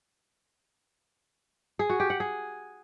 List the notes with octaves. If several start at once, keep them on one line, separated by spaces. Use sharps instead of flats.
G#4
F#4
G4
F#5
G#4